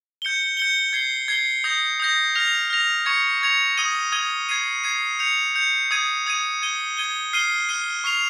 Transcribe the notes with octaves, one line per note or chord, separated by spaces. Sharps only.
G6 C#7 G7
G6 C#7 G7
G#6 C7 G7
G#6 C7 G7
D#6 G6 A#6
D#6 G6 A#6
F6 A#6 F7
F6 A#6 F7
C#6 G#6 C#7 F7
C#6 G#6 C#7 F7
D#6 G#6 D#7 G7
D#6 G#6 D#7 G7
G#6 C7 D#7
G#6 C7 D#7
G6 C#7 F7
G6 C#7 F7
D#6 G#6 D#7
D#6 G#6 D#7
G#6 D#7 G7
G#6 D#7 G7
F6 C7 D#7 G7
F6 C7 D#7 G7
C#6 F6 C7 F7